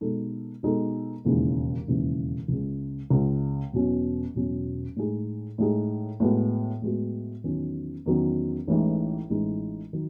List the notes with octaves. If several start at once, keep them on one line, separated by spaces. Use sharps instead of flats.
B2 G#3 D#4 A4
B2 G#3 D#4 A4
E1 D#2 C#3 E3 G#3
E1 D#2 C#3 E3 G#3
C#2 C#3 G#3
C#2 C#3 G#3
E1 E2 B2 F#3 C#4
E1 E2 B2 F#3 C#4
A2 G#3 D#4 G#4
A2 G#3 D#4 G#4
A2 G#3 B3 F#4
A2 G#3 B3 F#4
E2 D#3 F#3 C#4
E2 D#3 F#3 C#4
A1 A2 E3 G#3 D#4
A1 A2 E3 G#3 D#4
D#3 F#3